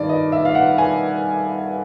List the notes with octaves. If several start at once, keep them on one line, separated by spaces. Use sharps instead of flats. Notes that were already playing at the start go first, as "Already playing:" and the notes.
Already playing: G2 D#3 D5
D#5
E5
F5
F#5
G#5